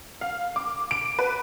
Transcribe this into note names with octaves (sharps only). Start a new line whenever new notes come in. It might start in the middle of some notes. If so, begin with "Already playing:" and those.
F5
D6
D7
B4